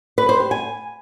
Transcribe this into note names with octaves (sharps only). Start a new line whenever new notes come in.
B4
C5
G4
G#5